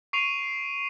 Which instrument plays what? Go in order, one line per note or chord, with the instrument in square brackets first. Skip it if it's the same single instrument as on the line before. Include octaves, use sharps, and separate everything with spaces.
[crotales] C#6 C7 D7 D#7 F7